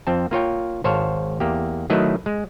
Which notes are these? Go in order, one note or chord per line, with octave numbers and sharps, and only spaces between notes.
F2 C4 A5
A#3 F4 C#5 G5
G#1 C5 C#5 F5 A5
E2 A#3 G4
D#3 F#3 A3 E4 B4 D#5
G#3